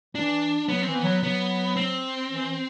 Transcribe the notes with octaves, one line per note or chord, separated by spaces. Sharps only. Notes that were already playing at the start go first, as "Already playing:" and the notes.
E3 D4
F#3 B3
C4
E3
B3
F#3
F#3 B3
C4
E3